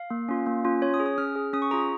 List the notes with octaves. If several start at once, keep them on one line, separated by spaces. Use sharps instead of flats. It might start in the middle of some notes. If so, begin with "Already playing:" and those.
Already playing: F5
A#3
C#4 F4
A#3
C#4 F4
C#4 C#5
D#6
G#4
D#6
C#4 F6
G#4
C#4 D#6
C#6
F4 G#4 A#5
C#6